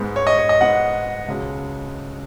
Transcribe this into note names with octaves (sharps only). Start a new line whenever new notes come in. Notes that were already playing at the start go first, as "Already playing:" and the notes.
Already playing: G#2 G#3 B3
C#5
D#5
C#5
D#5
G#2 G#3 B3 F#5
C#2 B2 G#3 C#4